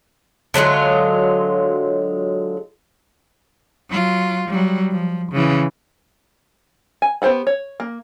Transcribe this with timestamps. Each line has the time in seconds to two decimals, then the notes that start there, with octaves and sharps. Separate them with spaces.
0.54 D3 F#3 G#3 F4
3.89 F#3 F4
4.48 F#3 G3
4.92 F3
5.32 C#3 E3
7.02 G#5
7.22 B3 G4 C5 F#5 B5
7.47 C#5
7.80 A#3